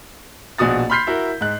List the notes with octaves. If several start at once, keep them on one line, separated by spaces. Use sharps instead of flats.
A#1 B2 F#4 D#6 A6
B5 C6 F6 G6 B6 C7
E4 F#4 A#4
G#2 F#6